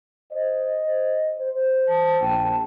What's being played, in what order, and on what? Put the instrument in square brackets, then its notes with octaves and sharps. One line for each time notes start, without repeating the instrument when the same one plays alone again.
[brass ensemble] C5 D#5
C5
[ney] A5
[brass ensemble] A#1 G5